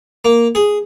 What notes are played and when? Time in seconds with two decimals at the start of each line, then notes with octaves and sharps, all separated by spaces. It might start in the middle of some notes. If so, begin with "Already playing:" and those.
0.25 A#3
0.55 G#4